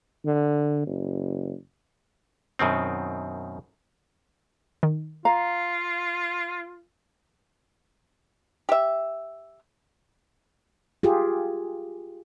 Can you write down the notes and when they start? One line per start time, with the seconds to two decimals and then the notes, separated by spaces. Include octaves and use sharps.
0.25 D3
0.86 F#1
2.59 F#2 B2 D#3 C4
4.83 D#3
5.25 F4 F5 A#5
8.69 G4 E5
11.03 F4 G4 G#4